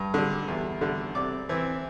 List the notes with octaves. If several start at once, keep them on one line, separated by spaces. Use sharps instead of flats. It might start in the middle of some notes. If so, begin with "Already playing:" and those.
Already playing: G2
D3 G3
E2
D3 G3
C3 D5 D6
E3 C4 E4